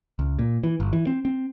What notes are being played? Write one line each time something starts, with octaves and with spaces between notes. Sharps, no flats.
C#2
A#2
E3
G1
E3
C4
C4